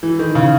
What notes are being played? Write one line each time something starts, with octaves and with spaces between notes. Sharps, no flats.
E3
D#3
C#3